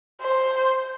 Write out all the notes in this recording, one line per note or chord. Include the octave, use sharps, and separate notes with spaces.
C5